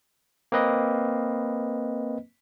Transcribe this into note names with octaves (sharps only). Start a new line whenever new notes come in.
A#3 C4 B4 D#5